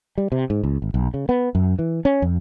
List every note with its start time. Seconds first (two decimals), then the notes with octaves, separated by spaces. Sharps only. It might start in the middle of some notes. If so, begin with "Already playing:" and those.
0.18 G3
0.32 C3
0.50 G#2
0.63 C#2
0.82 G#1
0.94 B1
1.14 C#3
1.29 B3
1.55 F#2
1.79 E3
2.05 C#4
2.22 F2